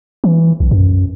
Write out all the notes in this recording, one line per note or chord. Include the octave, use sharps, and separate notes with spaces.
E3
B1
F#2